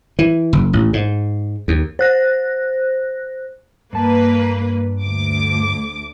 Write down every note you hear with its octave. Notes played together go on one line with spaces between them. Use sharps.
E3
F#1
A1
G#2
D#2
C5 F#6 A#6
G2 A#3 B4 A5
D2 D6